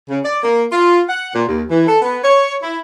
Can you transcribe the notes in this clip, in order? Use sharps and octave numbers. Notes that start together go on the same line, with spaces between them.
C#3
D5
A#3
F4
F#5
A#2
D#2
E3
A4
B3
C#5
E4